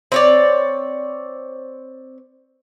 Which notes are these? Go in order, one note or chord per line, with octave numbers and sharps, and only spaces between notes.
C4 C#5 D5